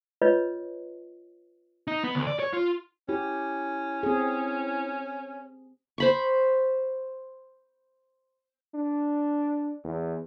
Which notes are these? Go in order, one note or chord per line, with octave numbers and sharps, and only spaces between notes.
F4 B4 C#5 D#5
D#4
B3
D2
D5
C#5
F4
C#4 E4 G4
C4 G#4
C5 B5 C#6
D4
E2